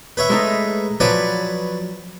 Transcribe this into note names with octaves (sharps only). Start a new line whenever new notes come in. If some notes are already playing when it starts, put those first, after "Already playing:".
B4 C#5 E5
G#3 A3 D#4
F3 F#3 B4 C#5 D5